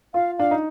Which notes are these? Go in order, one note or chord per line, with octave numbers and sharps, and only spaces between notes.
F4 F5
D4 F5
D#4